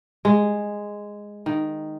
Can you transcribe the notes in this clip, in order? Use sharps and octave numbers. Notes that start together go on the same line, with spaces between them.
G#3
D#3